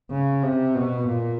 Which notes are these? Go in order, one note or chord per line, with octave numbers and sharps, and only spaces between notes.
C#3
C3
B2
A#2